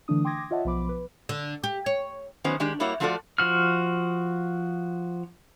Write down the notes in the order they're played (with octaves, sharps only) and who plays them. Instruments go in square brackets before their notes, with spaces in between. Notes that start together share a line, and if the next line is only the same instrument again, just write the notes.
[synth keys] D3 E3 A3 D4 D#6
G5 C6 D6 D#6 G#6 A#6
F4 C#5 D#5 E5 F#5 A5
B1 F3 B3 C5 B5 D6
B4
[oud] D3
G4
C#5
[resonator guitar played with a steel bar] D#3 F#3 B3 C#4 C5
D#3 G#3 D4 G4
G3 A#3 E4 F#4 C#5
F3 A3 F4 F#4 A4 D5
[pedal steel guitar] F3 F#4 F6